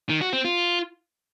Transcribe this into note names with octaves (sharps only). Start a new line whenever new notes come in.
D#3
F#4
C4
F4